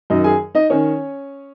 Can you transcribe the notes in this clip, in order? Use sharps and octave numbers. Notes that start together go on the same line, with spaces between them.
F#2 D#3 D#4 D#5
G#4 G#5
D#4 D#5
D#3 C#4 C#5